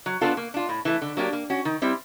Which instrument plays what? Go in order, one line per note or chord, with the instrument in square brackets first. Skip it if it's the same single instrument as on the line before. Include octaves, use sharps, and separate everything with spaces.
[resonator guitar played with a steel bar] F#3
B3 D4 F4 A4
A#3
D4 F4
A2
E3 A3
D3
F#3 A#3 D4 G4
A#3
C#4 F#4
D#3
G3 C4 E4